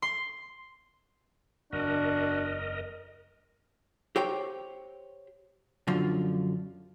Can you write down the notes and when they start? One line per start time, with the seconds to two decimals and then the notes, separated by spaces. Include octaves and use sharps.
0.02 C6
1.73 F#1 E2 D4 F#4 A#4 D#5
4.16 G4 C5 C#5 G5
5.87 F#2 D3 F3 F4